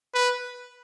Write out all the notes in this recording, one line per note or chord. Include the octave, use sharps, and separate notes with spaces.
B4